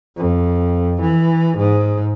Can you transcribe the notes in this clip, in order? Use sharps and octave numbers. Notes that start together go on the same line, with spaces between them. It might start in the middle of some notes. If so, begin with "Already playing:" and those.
F2
E3
G#2